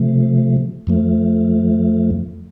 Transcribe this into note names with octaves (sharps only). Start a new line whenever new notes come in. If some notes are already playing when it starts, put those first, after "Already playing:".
Already playing: C3 F3 A3
F2 F3 A3